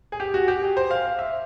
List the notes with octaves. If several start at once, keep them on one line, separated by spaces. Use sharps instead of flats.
G#4
G4
F#4
G4
G#4
C5
F5
F5
E5